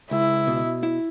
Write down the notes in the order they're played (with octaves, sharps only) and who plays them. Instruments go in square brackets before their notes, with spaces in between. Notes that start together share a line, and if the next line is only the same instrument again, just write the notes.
[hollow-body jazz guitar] C#2 [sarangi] E4
[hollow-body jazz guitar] B2
E4